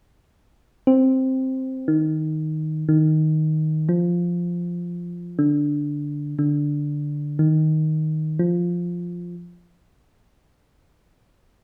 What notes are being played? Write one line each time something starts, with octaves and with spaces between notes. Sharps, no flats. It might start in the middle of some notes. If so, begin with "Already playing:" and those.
C4
D#3
D#3
F3
D3
D3
D#3
F3